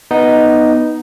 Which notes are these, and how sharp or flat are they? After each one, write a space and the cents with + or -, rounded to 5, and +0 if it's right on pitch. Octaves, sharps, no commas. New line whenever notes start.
B3 +0 D#4 +0